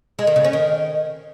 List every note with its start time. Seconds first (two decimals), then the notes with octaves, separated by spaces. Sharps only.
0.19 G#3
0.27 D#3
0.36 C#3
0.45 C#4
0.53 D#3